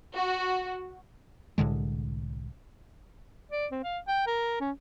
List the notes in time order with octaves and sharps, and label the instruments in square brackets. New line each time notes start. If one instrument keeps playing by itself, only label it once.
[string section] F#4
[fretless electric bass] C2 A2 D3 G#3
[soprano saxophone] D5
C4
F5
G5
A#4
C#4